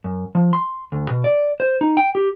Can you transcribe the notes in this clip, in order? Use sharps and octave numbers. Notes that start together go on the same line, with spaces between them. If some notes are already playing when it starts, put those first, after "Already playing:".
F#2
F3
C6
D2
B2
D5
C5
D#4
G5
G4